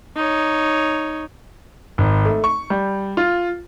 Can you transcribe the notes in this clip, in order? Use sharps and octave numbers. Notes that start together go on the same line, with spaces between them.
D#4 C#5
G#1
A3
C#6
G3
F4